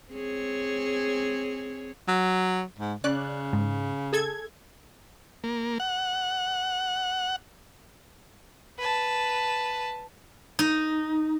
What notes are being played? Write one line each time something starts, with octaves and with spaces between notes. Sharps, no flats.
C4 G#4 C#5
F#3
G#2
C#3 C#4 D5 F#6
G#2
G#4 A4 G#6
A#3
F#5
B4 A5
D#4